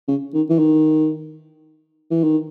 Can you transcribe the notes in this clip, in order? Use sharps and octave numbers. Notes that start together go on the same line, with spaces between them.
C#3
D#3
E3
D#3
E3
D#3